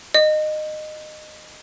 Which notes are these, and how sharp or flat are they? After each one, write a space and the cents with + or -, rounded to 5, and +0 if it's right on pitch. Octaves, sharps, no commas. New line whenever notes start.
D#5 -20